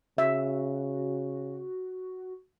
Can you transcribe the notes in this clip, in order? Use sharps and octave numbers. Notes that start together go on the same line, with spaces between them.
C#3 F#4 E5